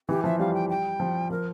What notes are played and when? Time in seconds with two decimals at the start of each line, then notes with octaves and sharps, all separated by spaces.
0.09 E3 G4
0.24 F3 E5
0.39 G3 F5
0.54 G5
0.69 G5
1.00 F3
1.31 F3 A#4